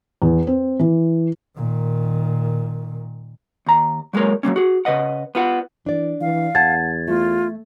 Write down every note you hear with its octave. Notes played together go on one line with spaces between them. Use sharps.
E2
C4
E3
A#2 D#3
D#2 A#5
F#3 G#3 A#3 A#4 C#5
F#3 G3 A#3 C#4
F#4 G#4
C#3 B4 D#5 F#5
B3 F4 F#5
E3 D4 D5
E3 F5
E2 F#5 A5 G#6 A6
A3 F4